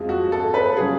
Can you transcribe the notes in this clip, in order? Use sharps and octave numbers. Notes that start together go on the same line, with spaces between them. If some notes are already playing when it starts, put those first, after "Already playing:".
Already playing: F2 F3 G#3
F#4
A4
B4
C#3 F#3 G#4